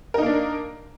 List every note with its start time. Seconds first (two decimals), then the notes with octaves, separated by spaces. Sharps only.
0.14 A#4
0.18 D#4
0.22 A#3
0.26 D4